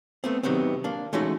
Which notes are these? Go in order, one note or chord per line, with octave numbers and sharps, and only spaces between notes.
A3 B3 C4
C3 D#3 F#3 B3 C4
A#3 D4
E3 G#3 A3 C#4 D#4 F#4